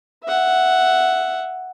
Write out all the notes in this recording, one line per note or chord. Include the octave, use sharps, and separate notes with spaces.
E5 F#5